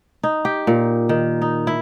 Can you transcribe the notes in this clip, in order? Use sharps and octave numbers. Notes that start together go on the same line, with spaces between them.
D#4
G4
A#2
D#3
D#4
E4